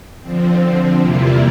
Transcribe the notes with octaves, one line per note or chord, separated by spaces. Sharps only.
D3 F3 C4
E2 C3 G3 A#3 E4 F4